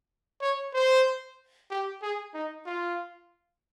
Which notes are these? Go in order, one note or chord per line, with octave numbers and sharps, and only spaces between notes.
C#5
C5
G4
G#4
D#4
F4